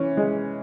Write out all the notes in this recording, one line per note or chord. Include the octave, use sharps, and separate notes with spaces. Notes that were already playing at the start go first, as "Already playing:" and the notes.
Already playing: E3 C#4
G#3